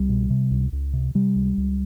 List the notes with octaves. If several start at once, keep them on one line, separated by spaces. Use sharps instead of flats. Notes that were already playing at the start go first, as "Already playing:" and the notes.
Already playing: C2 G3
B2
C3
C#2
C#2
C3
C3 G3
C#2
C#2